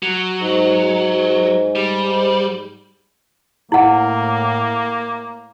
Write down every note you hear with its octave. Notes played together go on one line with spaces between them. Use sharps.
F#3
G#2
G3
A2 A#3 E4 F#5